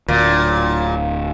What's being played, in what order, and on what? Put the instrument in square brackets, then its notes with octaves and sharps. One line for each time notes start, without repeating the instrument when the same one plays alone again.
[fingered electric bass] D1 D2 [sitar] A#2